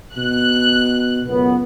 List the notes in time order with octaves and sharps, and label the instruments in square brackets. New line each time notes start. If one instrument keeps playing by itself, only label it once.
[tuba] B2 [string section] F#6
[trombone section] C#2 F#2 B3